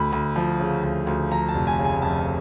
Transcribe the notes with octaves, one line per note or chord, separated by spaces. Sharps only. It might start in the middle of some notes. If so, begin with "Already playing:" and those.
Already playing: D2 B5
D2
F3
C#3
D2
D2
F3 A#5
A5
F1
G#5
C#3
G#5
F2 A5